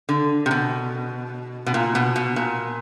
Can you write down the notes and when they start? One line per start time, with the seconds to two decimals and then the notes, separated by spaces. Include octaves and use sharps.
0.09 D3
0.46 C3
0.51 B2
1.66 B2
1.74 A#2
1.95 B2
2.16 B2
2.36 A#2